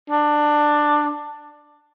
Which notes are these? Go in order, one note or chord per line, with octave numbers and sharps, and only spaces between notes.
D4